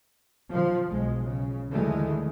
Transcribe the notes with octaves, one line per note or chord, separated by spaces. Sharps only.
F3
B1 G#3
C#3
D#2 D3 E3 F3 G#3 A3